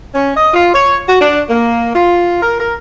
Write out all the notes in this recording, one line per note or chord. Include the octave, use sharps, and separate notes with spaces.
C#4
D#5
F4
C#5
F#4
D4
A#3
F4
A#4
A#4